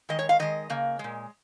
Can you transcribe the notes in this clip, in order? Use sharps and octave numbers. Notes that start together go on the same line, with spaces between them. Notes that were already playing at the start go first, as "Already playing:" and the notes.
D#3 G#3 D#5
C#5
F5
D#3 G#3 D#5
C#3 A#3
A#2 G#3